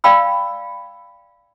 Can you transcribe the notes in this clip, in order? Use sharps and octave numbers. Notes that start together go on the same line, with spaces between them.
D5 F5 G5 B5 E6